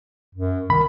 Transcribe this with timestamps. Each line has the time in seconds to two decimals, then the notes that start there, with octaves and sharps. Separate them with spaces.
0.35 F#2
0.70 C2 D#3 B5